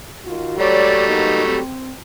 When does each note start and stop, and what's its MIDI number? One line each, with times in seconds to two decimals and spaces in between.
0.25 0.55 51
0.25 0.55 65
0.25 0.55 66
0.58 1.58 54
0.58 1.58 55
0.58 1.58 57
0.58 1.06 73
0.58 1.06 74
1.07 1.44 58
1.07 1.44 59
1.07 1.44 63
1.46 1.91 60